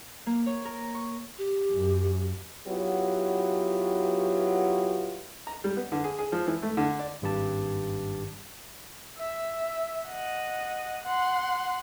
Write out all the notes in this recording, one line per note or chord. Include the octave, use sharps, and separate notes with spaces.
A#3
C#5
A#4
C#6
G4
F#2
F#3 B3 E4 F4 G4
A#5
G3
B3
D3
G#4
G#4
F3
E3
A3
D3
D5
G#1 G2 G4 A5
E5
D#5 F#5
F#5 C6